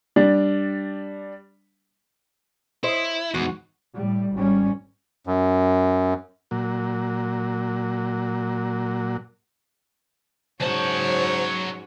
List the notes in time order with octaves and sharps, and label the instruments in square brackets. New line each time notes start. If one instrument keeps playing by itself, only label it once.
[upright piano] G3 D4
[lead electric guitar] E4 [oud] C5 D#5
[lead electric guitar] E2 [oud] G#2 F#4
[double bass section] A2 G3
G#1 G3 C#4
[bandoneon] F#2
[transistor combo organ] A#2 F#3
[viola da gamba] G#2 C#4 F#4 [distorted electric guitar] F#3 A5 [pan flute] C5 [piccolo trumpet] C#5